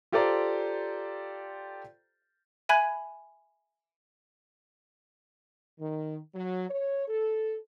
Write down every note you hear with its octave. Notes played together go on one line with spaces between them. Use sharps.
F4 G4 A4 C5 D5 A#5
E5 G#5 B5 F#6 G#6
D#3
F#3
C#5
A4